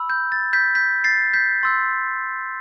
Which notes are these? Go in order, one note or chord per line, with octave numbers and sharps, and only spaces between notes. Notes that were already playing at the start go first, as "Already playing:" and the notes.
Already playing: B5 E6
G6
A6
G6 B6
G6 B6
A6 C7
G6 B6
C6 E6 G6 A6